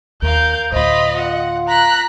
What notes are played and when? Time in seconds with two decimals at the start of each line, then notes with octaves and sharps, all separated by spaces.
0.22 D#2 A#4 F5 G6
0.72 D2 A2 F4 C5 D#5 B5
1.16 F4 F#5
1.68 A#5 F#6 B6